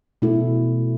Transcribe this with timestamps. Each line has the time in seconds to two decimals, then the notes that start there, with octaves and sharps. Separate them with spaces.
0.22 B2 A3 E4 A4